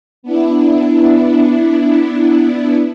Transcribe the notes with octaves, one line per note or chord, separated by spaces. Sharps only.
B3 D4 E4